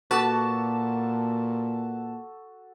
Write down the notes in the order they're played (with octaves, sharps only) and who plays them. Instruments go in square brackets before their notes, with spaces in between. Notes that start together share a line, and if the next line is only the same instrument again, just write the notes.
[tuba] A#2 [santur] F#4 A4 D6 [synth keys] B4 A5